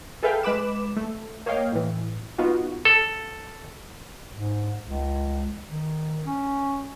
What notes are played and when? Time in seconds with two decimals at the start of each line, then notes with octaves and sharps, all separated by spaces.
0.23 G#4 A4 B4 E5 F5 G5
0.43 G#3 B4 B5 D6 E7
0.97 A3
1.46 A#3 C#5 D#5 F5 G5
1.72 A2 E3
2.38 B3 D#4 F4 F#4
2.85 A4
4.32 G#2
4.84 C#2
5.70 D#3
6.26 C#4